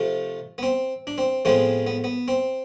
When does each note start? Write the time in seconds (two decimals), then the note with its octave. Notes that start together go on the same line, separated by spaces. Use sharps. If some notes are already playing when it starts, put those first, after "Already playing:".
Already playing: C3 F3 A3
0.58 B3
0.63 C4
1.07 D4
1.18 C4
1.45 A2 F3 G#3 B3 C4
1.87 B3
2.04 B3
2.28 C4